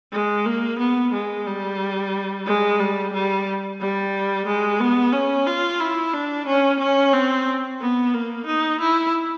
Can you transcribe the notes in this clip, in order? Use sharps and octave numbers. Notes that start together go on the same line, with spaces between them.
G#3
A#3
B3
G#3
G3
G#3
G3
G3
G3
G#3
B3
C#4
F4
E4
D4
C#4
C#4
C4
B3
A#3
D#4
E4